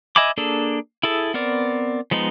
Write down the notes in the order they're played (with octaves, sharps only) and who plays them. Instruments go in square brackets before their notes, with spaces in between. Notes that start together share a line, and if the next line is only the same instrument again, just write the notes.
[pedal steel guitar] D#5 E5 G#5 B5 D6
A#3 D4 G#4 A4
E4 G#4 A4
B3 C4 A#4 D5
F3 G#3 B3 D#4